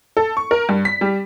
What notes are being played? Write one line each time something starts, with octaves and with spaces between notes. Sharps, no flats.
A4
C#6
A#4
G2
B6
G3